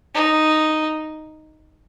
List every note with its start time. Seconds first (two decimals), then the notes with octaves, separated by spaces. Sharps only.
0.15 D#4